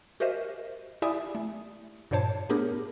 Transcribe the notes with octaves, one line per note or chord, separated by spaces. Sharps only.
F#4 G4 A#4 C5 D#5 E5
E4 G4 D5 E5 G#5 D#6
A3
G2 A#2 C5 C#5 A5
A3 B3 D4 G4 G#4 A#4